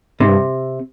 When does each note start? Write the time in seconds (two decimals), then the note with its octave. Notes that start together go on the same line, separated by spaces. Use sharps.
0.20 G#2 C3
0.28 G2